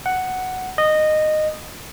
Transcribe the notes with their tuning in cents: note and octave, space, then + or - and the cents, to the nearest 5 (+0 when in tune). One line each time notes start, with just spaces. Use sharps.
F#5 +5
D#5 -15